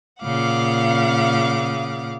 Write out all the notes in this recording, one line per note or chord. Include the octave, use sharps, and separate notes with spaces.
A#2 C#3 F5 F#5 D6